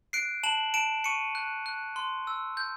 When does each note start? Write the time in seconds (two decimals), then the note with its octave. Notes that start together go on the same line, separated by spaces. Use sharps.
0.13 F#6 C7 D7
0.43 A5 E7 F#7
0.74 A5 D7 E7
1.04 C#6 C#7 D#7
1.35 F#6
1.66 F#6
1.96 C6
2.27 E6
2.57 G6